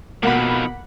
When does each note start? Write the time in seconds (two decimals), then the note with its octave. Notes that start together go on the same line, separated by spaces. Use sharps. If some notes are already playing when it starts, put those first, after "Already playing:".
0.23 F2 B2 D#3 A#3 F#5 B5